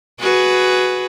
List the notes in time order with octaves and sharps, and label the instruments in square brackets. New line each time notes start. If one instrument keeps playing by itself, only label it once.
[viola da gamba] F#4 G#4 B4